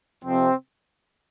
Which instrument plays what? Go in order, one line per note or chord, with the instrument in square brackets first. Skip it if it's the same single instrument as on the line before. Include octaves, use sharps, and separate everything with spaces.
[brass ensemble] F2 C3 F3 C4